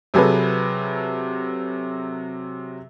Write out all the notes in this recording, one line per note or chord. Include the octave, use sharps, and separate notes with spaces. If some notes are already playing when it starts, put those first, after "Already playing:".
C3 F#3 G#4 A4 B4